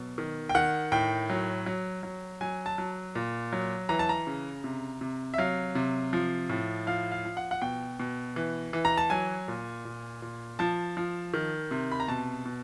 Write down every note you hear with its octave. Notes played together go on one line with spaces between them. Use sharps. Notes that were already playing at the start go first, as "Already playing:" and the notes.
Already playing: B2 F#3
D#3
G5
D#3 F#5
A2 G5
F#3
F#3
F#3
F#3 G#5
A5
F#3
A#2
F#3
E3 A#5
A5
A#5
C#3
C3
C3
E5
F#3 F5
C3
F3
A2
F3 F5
F5
F3
F#5
F#5
B2 G5
B2
E3
E3
A#5
A5
F#3 G#5
A#2
A#2
A#2
F3 A5
F3
D#3
C3
B5
A#5
B2 A5
B2